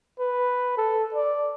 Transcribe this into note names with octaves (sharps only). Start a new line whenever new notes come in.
B4
A4
D5